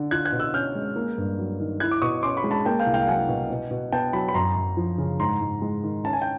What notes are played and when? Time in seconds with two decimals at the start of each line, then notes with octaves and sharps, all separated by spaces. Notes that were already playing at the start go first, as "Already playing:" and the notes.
Already playing: D3
0.11 F4 F#6 G#6
0.25 F#6 G#6
0.32 B2
0.40 E6 F#6
0.54 C#4 F6 G6
0.75 G#3
0.96 A#3
1.18 G2
1.39 F#3
1.60 D#3
1.80 E4 F#6 G#6
1.91 D6
2.02 B2 C#6 D#6
2.23 C#4 C6 D6
2.37 B5 C#6
2.44 G#3
2.51 A5 B5
2.65 A#3 G5 A5
2.79 F5 G5
2.86 C2
2.94 F5 G5
3.07 F#3 F#5 G#5
3.29 B2
3.50 B2
3.71 B2
3.92 B3 G5 A5
4.13 F#3 A5 B5
4.28 B5
4.34 F#2 A#5 C6
4.56 F#2
4.77 F3
4.98 C#3
5.20 G#2 A#5 C6
5.41 G#2
5.62 G#3
5.84 D#3
6.04 C#4 A5
6.13 G#5
6.22 G5